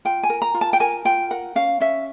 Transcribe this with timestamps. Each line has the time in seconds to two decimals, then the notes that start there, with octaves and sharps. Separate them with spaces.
0.05 F4 G5
0.23 G#5
0.30 A#4
0.42 A#5
0.54 F4
0.61 A5
0.73 G5
0.80 A#4 G#5
1.05 F4 G5
1.30 A#4 F#5
1.55 C#4 F5
1.80 C#4 E5